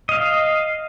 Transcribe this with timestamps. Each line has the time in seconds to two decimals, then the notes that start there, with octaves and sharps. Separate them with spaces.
0.09 D#5 F5